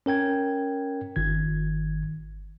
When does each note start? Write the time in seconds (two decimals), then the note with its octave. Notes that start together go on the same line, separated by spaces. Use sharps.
0.06 C#4 A#4 G5 G#6
1.16 G1 D#3 G#6